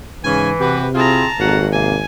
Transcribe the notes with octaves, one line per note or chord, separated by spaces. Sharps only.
G#2 C#3 E3 C#4 G#5
C3 F#4 G4 B4
C4 E4 F4 G#4 A5 A#5
G#1 F2 A#3 F#4 F#5
C3 A#3 G#5